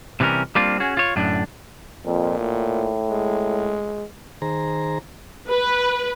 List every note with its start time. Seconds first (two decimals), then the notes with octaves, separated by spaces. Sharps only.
0.20 C3 E3 G3 C#4 A#4
0.55 G3 A#3 C4 D4 F4
0.80 C#4 F#4 G#4
0.97 F4 C#5
1.16 F#2 A2 D3 D4
2.06 F2 A#2
2.39 A2
3.10 G#3
4.42 D#3 G#4 C5 A#5
5.50 B4